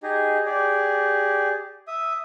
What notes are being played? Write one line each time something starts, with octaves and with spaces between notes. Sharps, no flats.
D#4 G4 G#4
G4 G#4 D5
E5 D#6